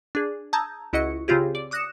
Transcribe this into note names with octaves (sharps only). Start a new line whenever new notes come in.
D4 G#4
A5 A#5 D#6 E6 G6 G#6
C#2 E4 F#4 D#5 C#6 C#7
C#3 C4 F4 G4 G#4
D5
D6 D#6 F#6 A#6 C#7 E7